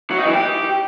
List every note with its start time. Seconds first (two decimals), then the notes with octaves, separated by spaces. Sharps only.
0.10 F#3
0.18 D#4
0.26 E3
0.33 G4